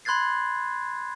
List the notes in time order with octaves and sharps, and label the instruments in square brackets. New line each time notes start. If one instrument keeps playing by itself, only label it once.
[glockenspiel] B5 C6 F#6 G#6 A6 C7